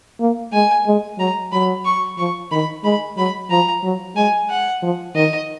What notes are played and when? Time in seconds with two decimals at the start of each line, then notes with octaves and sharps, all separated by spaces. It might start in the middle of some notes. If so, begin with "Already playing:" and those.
0.20 A#3
0.53 G#3 G#5
0.86 G#3
1.19 F#3 A#5
1.52 F#3 B5
1.85 C#6
2.18 F3 C#6
2.52 D#3 B5
2.84 G#3 B5
3.17 F#3 B5
3.50 F3 A#5
3.83 F#3
4.16 G#3 G#5
4.50 F#5
4.82 F3
5.15 D#3 D#5